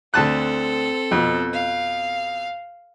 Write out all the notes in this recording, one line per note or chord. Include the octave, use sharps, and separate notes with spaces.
D2 C4 A4 A5 F#6
F2 B2
F5